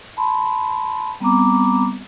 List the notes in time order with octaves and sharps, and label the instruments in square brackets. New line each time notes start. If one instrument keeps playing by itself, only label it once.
[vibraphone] A5 B5 C6
G3 B3 C4 A#5 B5 D6